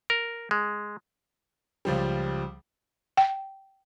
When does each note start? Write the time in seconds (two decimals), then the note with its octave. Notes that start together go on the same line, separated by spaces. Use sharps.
0.10 A#4
0.51 G#3
1.85 C#2 F3 G3
3.17 G5